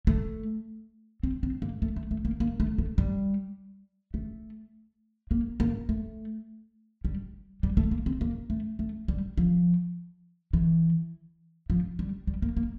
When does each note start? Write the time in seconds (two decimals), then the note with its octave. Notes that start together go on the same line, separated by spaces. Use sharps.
0.07 A3
1.23 C4
1.43 C4
1.62 A#3
1.82 A3
1.96 A3
2.11 A3
2.25 A#3
2.40 A#3
2.60 A3
2.78 A3
2.98 G3
4.14 A3
5.31 A#3
5.60 A#3
5.89 A3
7.05 G3
7.63 G3
7.77 A3
7.91 A#3
8.06 C4
8.21 A#3
8.50 A3
8.79 A3
9.08 G3
9.37 F3
10.53 E3
11.70 F3
11.99 G3
12.27 G3
12.42 A#3
12.57 A#3